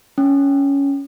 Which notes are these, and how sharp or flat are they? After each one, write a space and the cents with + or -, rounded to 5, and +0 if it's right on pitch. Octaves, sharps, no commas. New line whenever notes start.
C#4 +10